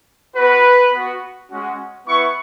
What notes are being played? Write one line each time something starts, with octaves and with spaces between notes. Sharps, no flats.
B3 F#4 B4
B3 F#4
G#3 C#4 F#4
B3 E4 C#6